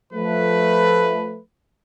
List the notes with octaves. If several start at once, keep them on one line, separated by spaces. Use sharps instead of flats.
F3 A3 B4